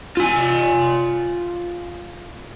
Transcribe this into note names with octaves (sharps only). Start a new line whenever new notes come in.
F4 G#5